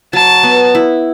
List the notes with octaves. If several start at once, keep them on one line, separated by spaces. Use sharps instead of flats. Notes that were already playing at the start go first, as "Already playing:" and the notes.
F#3 A5
B3
E4